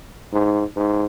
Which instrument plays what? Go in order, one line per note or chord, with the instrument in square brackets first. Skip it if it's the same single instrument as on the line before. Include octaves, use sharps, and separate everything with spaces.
[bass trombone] G#2
G#2